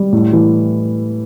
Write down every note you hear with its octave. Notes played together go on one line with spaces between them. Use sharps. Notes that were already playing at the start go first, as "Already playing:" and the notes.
Already playing: G3
A2
E3